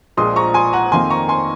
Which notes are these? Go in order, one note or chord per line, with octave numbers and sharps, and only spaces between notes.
A#1 A#2 F3 G#3 C6 D#6
A#5 C#6
G#5 C6
F#5 A#5
F2 D#3 A#3 G#5 C6
A#5 C#6
G#5 C6